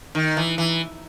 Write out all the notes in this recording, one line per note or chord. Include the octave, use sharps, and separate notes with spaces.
D#3
E3
E3